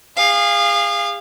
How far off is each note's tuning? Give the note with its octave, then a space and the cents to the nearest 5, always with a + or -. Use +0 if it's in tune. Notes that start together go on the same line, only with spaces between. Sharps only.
G#4 -35 F5 -5